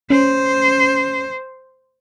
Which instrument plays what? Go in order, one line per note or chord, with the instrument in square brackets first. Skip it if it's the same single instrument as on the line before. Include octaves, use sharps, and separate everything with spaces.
[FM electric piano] C#4 [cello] C5